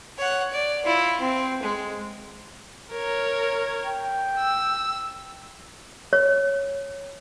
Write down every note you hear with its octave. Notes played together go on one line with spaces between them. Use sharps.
C#5 F#5
D5
E4 F4
C4
G#3
A#4 C#5
G5
E6
C#5